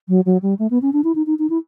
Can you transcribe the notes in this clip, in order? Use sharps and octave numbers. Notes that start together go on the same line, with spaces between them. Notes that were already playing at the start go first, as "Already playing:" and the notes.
F#3
F#3
G3
A3
B3
C#4
D4
E4
D#4
D#4
D#4
E4